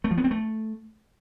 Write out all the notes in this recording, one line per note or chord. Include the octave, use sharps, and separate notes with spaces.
A3
F3
B3
C4
A3